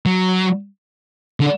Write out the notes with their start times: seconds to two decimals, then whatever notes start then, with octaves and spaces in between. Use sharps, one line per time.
0.06 F#3
1.40 D3